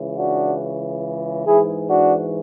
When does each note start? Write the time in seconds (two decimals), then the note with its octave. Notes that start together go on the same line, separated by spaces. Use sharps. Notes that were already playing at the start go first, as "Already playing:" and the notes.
Already playing: C#2 C#3 E3
0.17 D4 F#4
1.46 G#2 E3 E4 G#4
1.88 D4 F#4